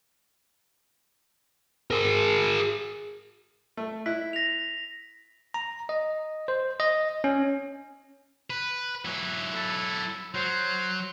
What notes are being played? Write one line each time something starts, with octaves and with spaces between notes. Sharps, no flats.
G#4 A#4
A3
E4 F#6 B6
A#6 F7
A#5
D#5
C5
D#5
C#4
B4
F#3 E4
A4
F#3 C5